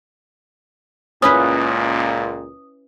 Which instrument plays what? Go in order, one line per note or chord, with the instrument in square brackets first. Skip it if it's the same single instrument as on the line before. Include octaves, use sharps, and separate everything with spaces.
[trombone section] C#2 A#2 [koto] C#4 E4 B4 [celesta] D#6